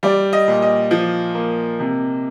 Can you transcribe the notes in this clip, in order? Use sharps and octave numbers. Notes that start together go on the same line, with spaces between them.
G3 D5
D#5
A#2
D#5
F3
A#3
C3